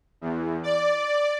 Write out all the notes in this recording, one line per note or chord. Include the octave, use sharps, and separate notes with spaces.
E2
D5